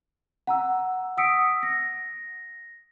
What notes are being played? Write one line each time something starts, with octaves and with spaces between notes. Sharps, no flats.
F#5 A#5 E6
F#5 D#6 E6 B6 C#7 D7
A#6